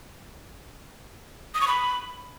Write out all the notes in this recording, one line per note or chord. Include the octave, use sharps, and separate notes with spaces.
D#6
C#6
B5